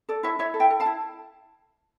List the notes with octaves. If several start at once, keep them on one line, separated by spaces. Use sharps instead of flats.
A4 D5
E4 C#5 E5
E4 C#5 E5
A4
E5 G5
A4
F5 A5
E4